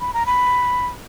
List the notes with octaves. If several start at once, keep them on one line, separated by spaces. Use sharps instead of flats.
B5
A#5
B5